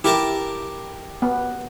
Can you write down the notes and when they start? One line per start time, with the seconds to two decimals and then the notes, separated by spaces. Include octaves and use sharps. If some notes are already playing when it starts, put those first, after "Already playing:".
0.04 E4 G4 A#4 A5
1.22 B3